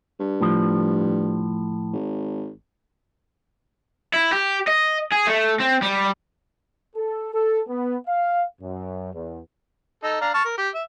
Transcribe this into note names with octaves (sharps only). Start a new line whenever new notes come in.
G2
A2 F3
G#1
E4
G4
D#5
G#4
A3
C4
G3
A4
A4
B3
F5
F#2
E2
D#4 A4
D4 F5 A#5
A5 C#6 F6
A#4
G4
E5